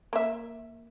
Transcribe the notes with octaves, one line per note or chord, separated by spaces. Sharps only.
A#3 E5